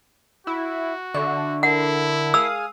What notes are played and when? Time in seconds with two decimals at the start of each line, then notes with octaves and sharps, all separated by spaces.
0.47 E4 F#4
1.14 D3 E5 C#6
1.63 E4 A#4 F#5 A5
2.34 G#4 F5 D#6 E6